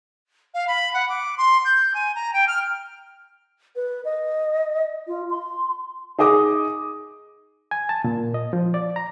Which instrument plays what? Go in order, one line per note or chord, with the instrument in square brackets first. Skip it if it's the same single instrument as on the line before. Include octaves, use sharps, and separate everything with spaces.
[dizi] F5
B5
F#5
D6
C6
G6
G#5
A#5
G5
F6
[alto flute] B4
D#5
F4
C6
[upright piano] D#4 G#4 D#5 D6 D#6
[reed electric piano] G#5
A5
A#2
D#5
F3
D5
A#5